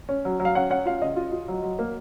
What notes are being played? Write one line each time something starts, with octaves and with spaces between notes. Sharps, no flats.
C#4
F#3
F#3
F5
C#4 F#5
C#4 F#5
F4 F5
C#3 D#5
F4
F4
F#3
F#3
A#3